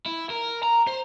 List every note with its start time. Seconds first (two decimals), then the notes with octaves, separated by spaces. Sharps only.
0.06 E4
0.30 A#4
0.63 A#5
0.87 C5